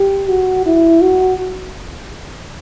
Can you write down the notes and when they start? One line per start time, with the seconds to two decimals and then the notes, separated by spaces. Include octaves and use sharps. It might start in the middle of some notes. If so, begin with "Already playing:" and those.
Already playing: G4
0.28 F#4
0.66 E4
1.02 F#4